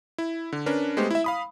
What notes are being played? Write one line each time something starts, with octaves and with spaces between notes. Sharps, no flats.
E4
D3
C#4 D4 A#4 B4
G#3 A3 B3 G4 C5
E4 E5
F5 B5 D#6